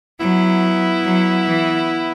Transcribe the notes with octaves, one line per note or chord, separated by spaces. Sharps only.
F#3 B3 E4
F#3
E3